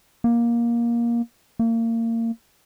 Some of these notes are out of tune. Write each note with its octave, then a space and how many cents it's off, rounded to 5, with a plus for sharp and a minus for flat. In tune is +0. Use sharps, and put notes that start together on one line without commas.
A#3 +15
A#3 -30